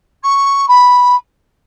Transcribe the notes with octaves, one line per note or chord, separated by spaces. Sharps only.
C#6
B5